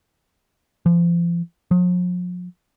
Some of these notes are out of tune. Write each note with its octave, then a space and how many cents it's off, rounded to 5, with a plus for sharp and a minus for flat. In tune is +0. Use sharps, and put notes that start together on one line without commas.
F3 -35
F3 +45